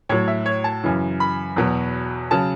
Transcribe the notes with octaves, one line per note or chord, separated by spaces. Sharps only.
A2 F#3 C#5
E5
C#5
A5
F#2 C#3 E3
B5
E2 B2 F#3
C#3 F#3 A5